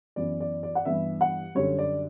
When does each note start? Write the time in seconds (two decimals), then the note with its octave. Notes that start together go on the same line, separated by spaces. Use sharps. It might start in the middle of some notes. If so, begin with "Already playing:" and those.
0.16 F#2 E3 B3 D5
0.40 D5
0.63 D5
0.75 F#5
0.85 G2 E3 G3 B3 E5
1.21 F#5
1.55 F#2 D3 G3 C#5
1.78 D5